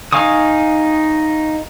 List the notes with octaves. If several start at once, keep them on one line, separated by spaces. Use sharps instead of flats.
D#4 F5 G#5 C#6 D#6